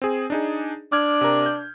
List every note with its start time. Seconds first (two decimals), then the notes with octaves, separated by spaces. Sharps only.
0.02 C4 G#4
0.30 D4 D#4 G#4
0.92 D4 D6 F6 G#6
1.21 C3 A#4
1.46 G6